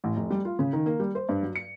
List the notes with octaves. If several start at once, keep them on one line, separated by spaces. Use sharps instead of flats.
A1
F1
G3
F4
C#3
D#3
A#3
G3
C5
G2
F#3
C#7